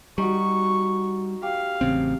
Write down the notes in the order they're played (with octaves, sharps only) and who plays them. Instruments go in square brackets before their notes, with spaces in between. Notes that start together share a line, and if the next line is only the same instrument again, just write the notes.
[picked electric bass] G3 [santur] D#4 F#4 [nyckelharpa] C#6
[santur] G4 [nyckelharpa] F5
[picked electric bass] A1 C#3 C4